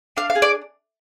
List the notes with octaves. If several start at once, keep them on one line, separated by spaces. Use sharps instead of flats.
D4 F5
F5
G#4
D5